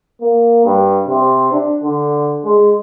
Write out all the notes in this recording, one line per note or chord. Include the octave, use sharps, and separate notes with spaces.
A#3
G2
C3
D4
D3
G#3